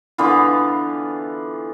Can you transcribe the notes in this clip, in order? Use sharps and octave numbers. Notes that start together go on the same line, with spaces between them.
D3 E3 B3 F4